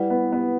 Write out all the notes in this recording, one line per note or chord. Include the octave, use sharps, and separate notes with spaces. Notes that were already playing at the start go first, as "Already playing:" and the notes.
Already playing: G3 E4 B4 F#5
B3
B3